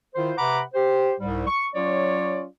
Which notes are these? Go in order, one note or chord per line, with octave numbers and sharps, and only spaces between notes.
D#3 E4 F4 C5
C3 B4 F#5 A#5 B5 D6
G4 C5
C2 G#2 G3
C#6
F#3 C#4 F4 C#5 D5